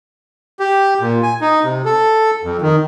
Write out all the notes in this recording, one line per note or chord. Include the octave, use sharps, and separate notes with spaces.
G4
A#2
G#5
D#4
C3
A4
F2
D#3